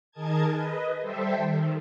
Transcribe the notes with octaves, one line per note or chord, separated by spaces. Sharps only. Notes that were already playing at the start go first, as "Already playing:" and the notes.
D#3 G#4 A#4 D#5 A5 G#6
B4 D#5
G3 G4 A4 C5 E5
D#3